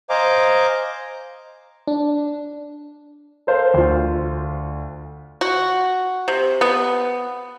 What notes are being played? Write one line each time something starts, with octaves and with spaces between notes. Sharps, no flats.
C5 D#5 F5 G#5 A#5 D6
D4
A4 A#4 C5 F5
D2 F4
F#4
C3
B3